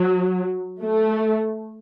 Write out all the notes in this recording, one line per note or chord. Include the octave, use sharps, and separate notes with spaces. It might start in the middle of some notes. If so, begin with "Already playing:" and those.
Already playing: F#3
A3